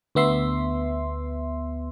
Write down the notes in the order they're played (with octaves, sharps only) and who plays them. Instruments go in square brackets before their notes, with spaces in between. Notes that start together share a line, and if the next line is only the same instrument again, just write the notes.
[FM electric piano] D2 B3 E5 C6